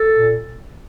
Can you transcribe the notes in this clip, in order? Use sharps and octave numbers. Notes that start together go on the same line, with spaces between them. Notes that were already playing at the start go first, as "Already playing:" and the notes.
Already playing: A4
A#2